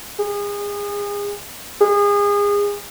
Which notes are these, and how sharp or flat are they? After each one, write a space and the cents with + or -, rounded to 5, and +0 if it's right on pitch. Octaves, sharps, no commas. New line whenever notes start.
G#4 -30
G#4 -30